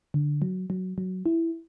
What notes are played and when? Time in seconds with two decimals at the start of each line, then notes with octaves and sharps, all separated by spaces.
0.14 D3
0.42 F#3
0.70 F#3
0.98 F#3
1.26 E4